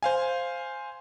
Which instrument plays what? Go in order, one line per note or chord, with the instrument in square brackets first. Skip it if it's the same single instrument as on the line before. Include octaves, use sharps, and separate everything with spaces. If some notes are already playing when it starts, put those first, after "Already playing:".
[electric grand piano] C5 F5 G#5